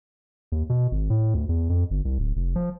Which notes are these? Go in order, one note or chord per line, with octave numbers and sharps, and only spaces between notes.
D#2
B2
G#1
A2
D2
E2
F2
G1
C2
D1
F1
F3